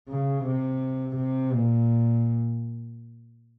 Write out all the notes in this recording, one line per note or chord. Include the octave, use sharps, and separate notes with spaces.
C#3
C3
C3
A#2